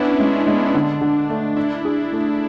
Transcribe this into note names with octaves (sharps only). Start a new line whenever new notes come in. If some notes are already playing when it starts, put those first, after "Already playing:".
Already playing: B3 C#4 D4 E4 B4
D4
G#3
C#4
G#3
B3
D3 D4
D3
A3
D4 E4
G#4
A3